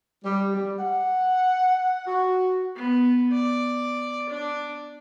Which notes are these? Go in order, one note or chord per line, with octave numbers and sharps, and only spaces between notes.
G3
G3
F#5
F#4
B3
D5
D4